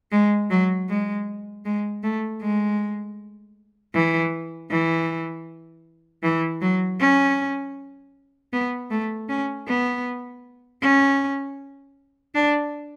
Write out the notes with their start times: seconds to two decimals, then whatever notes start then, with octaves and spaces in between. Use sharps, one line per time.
0.12 G#3
0.50 F#3
0.89 G#3
1.65 G#3
2.03 A3
2.41 G#3
3.94 E3
4.71 E3
6.23 E3
6.61 F#3
7.00 C#4
8.53 B3
8.91 A3
9.29 C#4
9.68 B3
10.82 C#4
12.35 D4